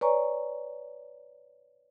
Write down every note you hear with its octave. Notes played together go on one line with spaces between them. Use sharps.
B4 C#5 D5 G#5 A#5 C#6